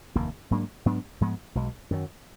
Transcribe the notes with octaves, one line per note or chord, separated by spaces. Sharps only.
F1 D#2 D#3 A#3
G#2 F#3 A#3 D4
G#2 F#3 B3 D4
G#2 F3 G#3 B3
B1 B2 G#3
F#2 D#3 F#3